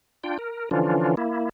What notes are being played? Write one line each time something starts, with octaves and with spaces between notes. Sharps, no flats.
D4 F4 G5
A#4
D3 E3 F3 C#4 D4 F4
A#3 E4